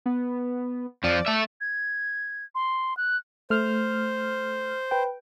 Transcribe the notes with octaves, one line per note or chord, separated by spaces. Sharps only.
B3
F2 F3 D5
A3 E5
G#6
C6
F#6
A3 C5 F6
B4 G5